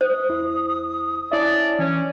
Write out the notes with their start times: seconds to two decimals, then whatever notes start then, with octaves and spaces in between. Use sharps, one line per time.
0.01 C5 D#6
0.29 E2 E4
1.32 C#4 D4 E4 D5 E5
1.79 E3 C#4